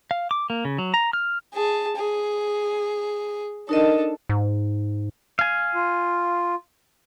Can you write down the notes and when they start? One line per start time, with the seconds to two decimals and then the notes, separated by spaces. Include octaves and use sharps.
0.11 F5
0.31 D6
0.50 A#3
0.65 C#3
0.78 F#3
0.94 A#5
1.13 F6
1.54 G#4 A5
1.96 G#4
3.69 D4 D#4 A4 A#4 D#5
4.29 G#2
5.39 F5 G#5
5.75 F4